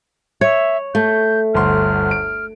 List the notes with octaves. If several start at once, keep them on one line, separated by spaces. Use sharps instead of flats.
C#5 E5
A3 G6
G1 D2 C6 F6
D7